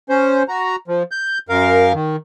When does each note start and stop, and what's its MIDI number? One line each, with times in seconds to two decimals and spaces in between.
0.09 0.43 61
0.09 0.43 72
0.48 0.76 66
0.48 0.76 82
0.88 1.03 53
1.11 1.38 91
1.49 1.93 42
1.49 1.93 70
1.49 1.93 77
1.94 2.16 51